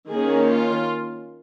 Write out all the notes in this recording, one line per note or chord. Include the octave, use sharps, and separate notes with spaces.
D#3 A#3 C#4 G#4
F4